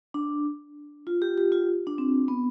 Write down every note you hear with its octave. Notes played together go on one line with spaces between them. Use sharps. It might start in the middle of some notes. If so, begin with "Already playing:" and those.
D4
F4
G4
G4
F4
D4
C4
B3